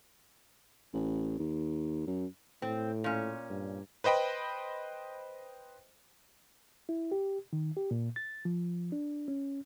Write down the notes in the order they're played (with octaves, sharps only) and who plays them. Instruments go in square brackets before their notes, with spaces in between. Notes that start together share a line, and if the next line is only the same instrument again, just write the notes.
[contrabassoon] A1
D#2
F#2
[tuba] A2 [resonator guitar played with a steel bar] C4
[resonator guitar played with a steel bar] A#2 C#4
[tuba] G2
[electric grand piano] B4 C5 D#5 G5 B5
[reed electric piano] E4
G4
D#3
G4
A#2
A6
F3
D4
C#4